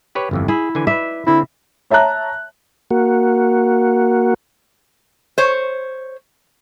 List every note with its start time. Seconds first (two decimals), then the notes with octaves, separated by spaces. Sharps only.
0.15 G4 B4 C#5
0.31 G1 F2 E3
0.48 E4 G#4
0.75 D3 E3 G#5
0.87 B4 D5 E5
1.27 D3 C4 E4
1.90 C#5 E5 A5 A#5 F#6
2.91 A#3 F#4
5.38 C5 C#5